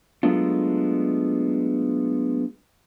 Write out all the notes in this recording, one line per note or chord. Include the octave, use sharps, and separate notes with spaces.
F#3 G#3 A3 B3 D4 F4